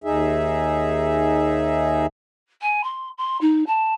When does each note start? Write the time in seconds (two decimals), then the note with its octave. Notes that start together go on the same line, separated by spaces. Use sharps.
0.04 D#2 D#4 G#4 E5
2.61 G#5
2.83 C6
3.18 C6
3.41 D#4
3.66 A5